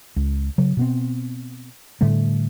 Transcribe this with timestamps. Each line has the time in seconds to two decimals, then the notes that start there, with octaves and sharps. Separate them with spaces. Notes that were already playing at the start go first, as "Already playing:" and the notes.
0.16 C#2
0.58 C#3 F#3
0.77 B2 B3 C4
2.01 A2 D3 G3 A3